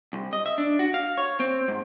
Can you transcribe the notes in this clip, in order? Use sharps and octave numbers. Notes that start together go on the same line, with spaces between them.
C2
D#5
E5
D4
F#4
F5
C#5
C4
G#2